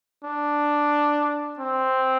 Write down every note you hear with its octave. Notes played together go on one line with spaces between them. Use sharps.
D4
C4